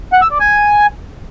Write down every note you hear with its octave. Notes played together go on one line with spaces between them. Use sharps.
F#5
E6
D5
G#5